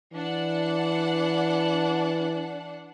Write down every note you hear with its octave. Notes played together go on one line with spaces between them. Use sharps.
E3 D4 F#5